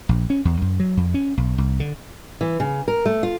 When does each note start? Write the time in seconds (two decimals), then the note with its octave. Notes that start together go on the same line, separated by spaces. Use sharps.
0.09 A#1
0.30 C#4
0.45 E2
0.62 F#2
0.80 F#3
0.97 F2
1.14 C#4
1.37 B1
1.58 C2
1.80 D3
2.41 E3
2.60 C#3
2.88 A#4
3.06 A3
3.23 F4